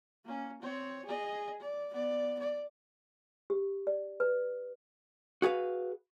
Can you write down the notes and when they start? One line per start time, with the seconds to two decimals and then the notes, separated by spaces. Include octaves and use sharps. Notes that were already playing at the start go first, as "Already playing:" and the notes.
0.24 A#3 C#4
0.62 C4 C#5
1.05 G#4 D#5
1.60 D5
1.91 B3 D5
2.39 D5
3.50 G4
3.87 D5
4.20 B4
5.42 F#4 G#4 B4 F5